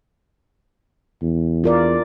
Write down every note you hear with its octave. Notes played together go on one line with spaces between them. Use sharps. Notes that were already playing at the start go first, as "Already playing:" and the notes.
E2
F4 A#4 D5